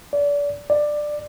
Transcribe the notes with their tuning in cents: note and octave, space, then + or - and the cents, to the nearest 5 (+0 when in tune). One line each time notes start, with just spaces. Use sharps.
D5 -30
D5 +15